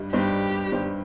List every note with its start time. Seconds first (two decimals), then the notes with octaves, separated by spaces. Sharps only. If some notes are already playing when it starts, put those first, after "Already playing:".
Already playing: G2 G3 D#4
0.12 G2 G3 D#4 G4 C5
0.72 G2 G3 D#4 C5